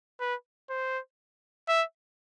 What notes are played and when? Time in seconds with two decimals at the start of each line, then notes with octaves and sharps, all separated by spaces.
0.20 B4
0.70 C5
1.68 E5